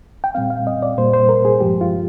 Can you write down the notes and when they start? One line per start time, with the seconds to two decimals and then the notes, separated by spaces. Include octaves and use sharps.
0.24 G5
0.35 A#2 G3 C4 F5
0.50 F5
0.67 D#5
0.82 D5
0.98 A#2 G3 A#3 C5
1.14 C5
1.29 A#4
1.45 G#4
1.60 G2 F3 G#3 G4
1.81 F4